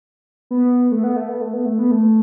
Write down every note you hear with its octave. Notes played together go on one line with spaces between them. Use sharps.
B3
A3
B3
A3
B3
A3
B3
A3
B3
A3